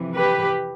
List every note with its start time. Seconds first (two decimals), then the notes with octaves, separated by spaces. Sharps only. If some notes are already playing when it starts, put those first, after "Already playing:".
Already playing: F2 C3 E3
0.16 G4 B4